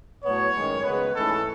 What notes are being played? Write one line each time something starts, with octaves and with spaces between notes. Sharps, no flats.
A2 F#3 B3 C#5
F#2 D#3 G#3
C#3 G#3 B3 B4
G#2 E3 A3 C#4 A4